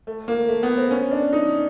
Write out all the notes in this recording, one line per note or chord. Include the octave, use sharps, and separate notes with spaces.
A3
A#3
A3
B3
C4
C#4
D4
D#4